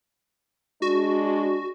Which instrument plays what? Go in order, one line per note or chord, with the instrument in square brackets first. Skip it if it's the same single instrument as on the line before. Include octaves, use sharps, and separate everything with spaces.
[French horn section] G#3 D4 [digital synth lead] F#4